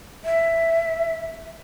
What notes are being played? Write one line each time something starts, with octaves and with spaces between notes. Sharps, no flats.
E5